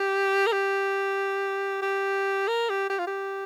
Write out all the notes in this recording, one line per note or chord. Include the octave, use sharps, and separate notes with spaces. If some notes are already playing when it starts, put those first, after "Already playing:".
Already playing: G4
A#4
G4
G4
A#4
G4
G4
F4
G4